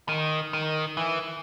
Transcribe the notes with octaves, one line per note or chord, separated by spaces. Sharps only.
D#3
D#3
E3